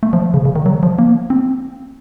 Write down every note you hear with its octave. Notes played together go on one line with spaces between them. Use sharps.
A3
F3
C#3
C#3
D#3
F#3
F3
A#3
C4